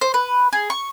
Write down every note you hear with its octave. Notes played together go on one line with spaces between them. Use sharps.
C5
B4
G#4
C#6